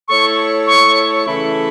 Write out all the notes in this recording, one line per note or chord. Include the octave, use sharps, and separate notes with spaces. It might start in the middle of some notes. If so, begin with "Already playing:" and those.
A3 E4 A4 C#5 C#6
C#6
C#3 E3 A3 E4 A4